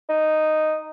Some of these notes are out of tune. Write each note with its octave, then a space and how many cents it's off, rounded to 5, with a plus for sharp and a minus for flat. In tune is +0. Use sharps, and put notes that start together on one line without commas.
D#4 -5